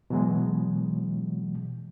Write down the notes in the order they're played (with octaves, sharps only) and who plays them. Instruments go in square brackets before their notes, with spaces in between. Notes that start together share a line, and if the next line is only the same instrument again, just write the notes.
[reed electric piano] B2 E3 F#3 G#3